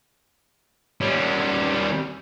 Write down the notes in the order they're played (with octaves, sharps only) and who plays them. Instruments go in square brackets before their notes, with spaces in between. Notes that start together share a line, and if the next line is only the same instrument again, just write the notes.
[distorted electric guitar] G3 C#4